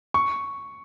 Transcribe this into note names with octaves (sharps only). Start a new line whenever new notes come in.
C#6